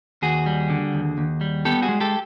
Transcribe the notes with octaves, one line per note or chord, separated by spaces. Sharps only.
D#2 F#4 G#4
G3
D3
D#2
D#2
G3
B3 G4 A4
F#4 G#4
G#3
G4 A4